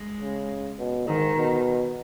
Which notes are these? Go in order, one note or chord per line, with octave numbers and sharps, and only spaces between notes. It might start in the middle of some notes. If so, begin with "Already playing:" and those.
Already playing: G#3
C#3
B2
G#2 D#3
B2